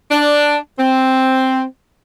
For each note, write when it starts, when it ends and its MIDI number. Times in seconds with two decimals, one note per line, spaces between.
0.11 0.57 62
0.78 1.63 60